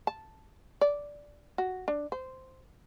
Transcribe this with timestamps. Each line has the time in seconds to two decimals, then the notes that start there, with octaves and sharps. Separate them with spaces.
0.07 A5
0.81 D5
1.58 F#4
1.88 D4
2.12 C5